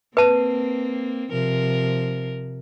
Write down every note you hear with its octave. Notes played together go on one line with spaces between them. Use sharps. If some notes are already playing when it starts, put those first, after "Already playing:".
A#3 C4 B4 A5
C3 F3 A#4